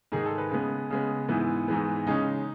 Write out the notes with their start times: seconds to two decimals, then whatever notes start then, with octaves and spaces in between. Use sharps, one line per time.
0.12 G#2 D#3 G#3 G#4
0.26 A4
0.38 B4
0.51 C#3 G#3 B3
0.90 C#3 G#3 B3
1.28 G#2 E3 G#3 B3 E4
1.68 G#2 E3 G#3 B3
2.07 C#3 G#3 C#4 D#4